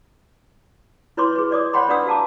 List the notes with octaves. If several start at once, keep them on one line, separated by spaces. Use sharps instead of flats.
E4 B4 C#5 C6 D6
G#4 B4
C#5 D5 D6 D#6
C5 C#5 F#5 G5 B5 C6
D4 B4 D5 F#5 D#6 E6
G4 F5 A5 A#5 D6